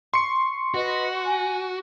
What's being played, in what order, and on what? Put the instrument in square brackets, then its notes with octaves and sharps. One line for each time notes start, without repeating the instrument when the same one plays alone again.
[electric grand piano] C6 C#7 [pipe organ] C#6
[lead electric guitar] F#4 [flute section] B4 D#5
[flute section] G#5